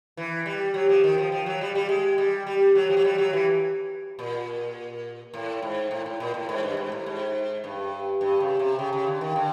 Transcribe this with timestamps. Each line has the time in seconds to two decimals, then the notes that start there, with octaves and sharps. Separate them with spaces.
0.17 E3
0.46 G3
0.74 F#3
0.89 F3
1.04 D#3
1.18 F3
1.32 F3
1.46 F#3
1.61 G3
1.75 G3
1.89 G#3
2.18 G3
2.47 G3
2.75 F#3
2.90 F3
2.97 F#3
3.04 G3
3.18 F#3
3.33 E3
4.19 A#2
5.34 A2
5.62 G#2
5.91 A2
6.06 A2
6.20 A#2
6.34 A2
6.49 G#2
6.63 G2
6.77 G#2
6.92 A2
7.06 G#2
7.64 G2
8.21 G2
8.40 C#3
8.59 C3
8.79 C#3
8.93 C#3
9.07 D3
9.21 D#3
9.36 D3